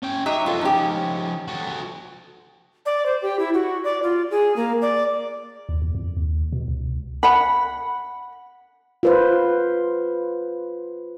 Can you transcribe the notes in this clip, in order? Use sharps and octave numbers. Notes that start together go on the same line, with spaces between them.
C#4 G5
F#3 D#4 G4 E5
F3 D#4 F4 A4
C#4 G4
F#4 A4
D5
C5
G4
E4
F#4
D5
F4
G#4
A#3
D5
D#2
E2
F2
D#2
B2
C#2
F#5 B5
F4 B4 C5